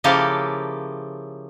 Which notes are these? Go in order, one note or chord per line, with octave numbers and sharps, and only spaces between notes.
C#3 F3 A#3 E4 G4 A4